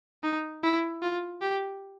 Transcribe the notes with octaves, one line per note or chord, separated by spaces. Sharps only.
D#4
E4
F4
G4